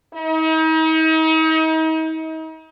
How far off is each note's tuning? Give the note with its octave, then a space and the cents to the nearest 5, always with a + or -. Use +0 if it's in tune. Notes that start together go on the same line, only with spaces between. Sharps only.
D#4 +40